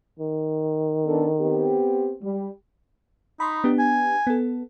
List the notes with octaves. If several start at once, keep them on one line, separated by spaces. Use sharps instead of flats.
D#3
B3 D4 A4
B3 C4 G4
G3
D#4 B5 C6
B3 D4 G4
G#5
B3 A4